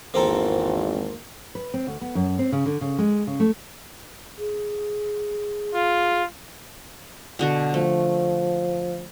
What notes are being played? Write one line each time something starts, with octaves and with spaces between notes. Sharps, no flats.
G#1 E2 A#3 C4 A4 C5 A#5
B4
C4
D2
B3
F#2
C4
C#3
D3
C#3
G#3
C#3
A3
G#4
F4
B2 D3 F#4
F3 A3